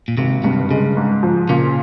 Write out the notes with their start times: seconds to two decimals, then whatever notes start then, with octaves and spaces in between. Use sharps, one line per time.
0.08 A#2
0.17 G#1 C3
0.44 G2 C3
0.71 C#3 G#3
0.97 G#2
1.23 F3
1.49 A#2 C#3